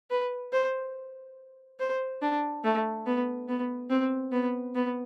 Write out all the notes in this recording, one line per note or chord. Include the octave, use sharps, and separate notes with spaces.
B4
C5
C5
D4
A3
B3
B3
C4
B3
B3